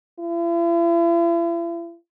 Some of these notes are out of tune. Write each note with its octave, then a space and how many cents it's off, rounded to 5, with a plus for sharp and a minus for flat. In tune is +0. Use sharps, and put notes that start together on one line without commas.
E4 +45